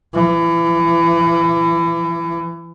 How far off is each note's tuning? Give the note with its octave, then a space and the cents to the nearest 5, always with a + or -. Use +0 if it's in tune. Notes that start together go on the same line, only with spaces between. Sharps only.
E3 +30